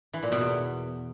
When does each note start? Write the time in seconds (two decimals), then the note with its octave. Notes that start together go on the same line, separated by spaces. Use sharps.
0.13 E3
0.23 A#2
0.32 B2
0.41 E2